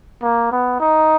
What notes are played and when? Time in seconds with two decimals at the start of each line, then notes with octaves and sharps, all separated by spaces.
0.22 A#3
0.51 B3
0.80 D#4